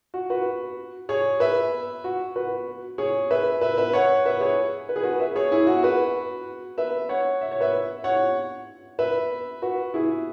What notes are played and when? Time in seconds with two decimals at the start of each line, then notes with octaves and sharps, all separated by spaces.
0.14 F#4
0.30 F#4 B4
1.09 G#4 C#5
1.40 B4 E5
2.04 F#4
2.36 F#4 B4
2.98 G#4 C#5
3.31 B4 E5
3.61 B4 E5
3.77 B4 E5
3.93 C#5 F#5
4.26 B4 E5
4.41 G#4 C#5
4.89 B4
4.96 G#4
5.03 F#4 B4
5.20 B4 E5
5.36 G#4 C#5
5.52 E4 G#4
5.67 F#4
5.83 F#4 B4
6.78 B4 E5
7.09 C#5 F#5
7.41 E5
7.52 C#5
7.61 B4 E5
8.04 C#5 F#5
8.99 B4 E5
9.62 F#4 B4
9.94 E4 G#4